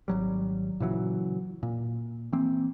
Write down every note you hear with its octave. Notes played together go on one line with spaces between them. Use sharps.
G#1 F#3 G3
A#2 C#3 E3 F#3
A#2
E3 A#3 C4